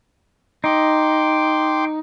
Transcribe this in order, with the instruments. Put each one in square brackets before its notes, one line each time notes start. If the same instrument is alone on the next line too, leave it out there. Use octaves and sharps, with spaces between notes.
[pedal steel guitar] D#4 [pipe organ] G5 C6 D6